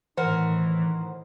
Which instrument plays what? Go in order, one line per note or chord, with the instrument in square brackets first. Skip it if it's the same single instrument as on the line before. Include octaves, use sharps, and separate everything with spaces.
[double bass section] A2 D#3 [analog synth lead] E3 [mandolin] F#4 A#4 [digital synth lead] C5